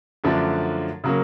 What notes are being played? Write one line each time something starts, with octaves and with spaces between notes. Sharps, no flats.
F#2 D3 F3 A3 D4
C#3 F#3 A#3